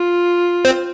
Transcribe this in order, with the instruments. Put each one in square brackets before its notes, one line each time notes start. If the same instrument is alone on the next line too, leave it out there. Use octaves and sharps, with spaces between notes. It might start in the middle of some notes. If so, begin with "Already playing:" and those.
Already playing: [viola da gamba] F4
[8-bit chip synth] C4